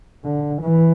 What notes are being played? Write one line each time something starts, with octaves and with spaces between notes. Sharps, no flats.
D3
E3